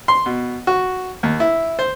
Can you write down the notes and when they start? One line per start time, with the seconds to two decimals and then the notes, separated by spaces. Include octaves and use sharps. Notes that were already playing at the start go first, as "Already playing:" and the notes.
0.08 C6
0.26 B2
0.67 F#4
1.23 D#2
1.40 E4
1.79 C5